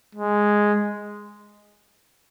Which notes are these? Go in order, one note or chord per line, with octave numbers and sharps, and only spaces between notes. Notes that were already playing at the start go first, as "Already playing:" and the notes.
G#3